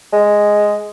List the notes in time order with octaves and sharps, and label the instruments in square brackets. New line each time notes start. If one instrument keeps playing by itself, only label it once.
[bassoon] G#3